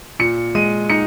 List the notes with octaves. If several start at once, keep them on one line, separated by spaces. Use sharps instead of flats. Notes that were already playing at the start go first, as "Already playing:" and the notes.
A#2 C#7
G#3 D#7
D#4 C#7